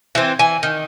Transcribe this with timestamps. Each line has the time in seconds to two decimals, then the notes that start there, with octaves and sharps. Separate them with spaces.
0.15 E3 C4
0.39 E3 G#5
0.63 D#3